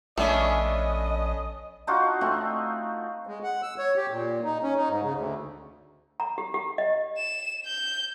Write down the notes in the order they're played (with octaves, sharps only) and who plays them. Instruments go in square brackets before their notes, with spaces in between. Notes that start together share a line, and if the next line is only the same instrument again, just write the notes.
[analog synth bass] A#1 [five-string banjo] A3 [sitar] B3 C#4 D4 [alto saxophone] D#5
[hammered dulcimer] D4 D#4 F4 F#4
A3 C4 D#4
[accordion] G#3
F#5
E6
C#5
G4
A#2
D#4
C#4
D#4
G#2
C#3
D2
[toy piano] A#5
G4
G4
D#5
[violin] E7
G6